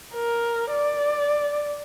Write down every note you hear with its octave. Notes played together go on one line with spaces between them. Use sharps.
A#4
D5